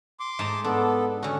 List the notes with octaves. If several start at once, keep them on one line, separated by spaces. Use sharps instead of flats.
C6 D6
G#2 A5 A#5
B3 D4 A4
D3 C#4 F#4